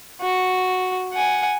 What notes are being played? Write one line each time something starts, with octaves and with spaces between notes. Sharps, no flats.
F#4
F#5 G#5